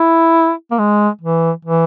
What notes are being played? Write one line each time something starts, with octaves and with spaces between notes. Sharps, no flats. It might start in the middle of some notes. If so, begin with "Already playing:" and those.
Already playing: E4
A#3
G#3
E3
E3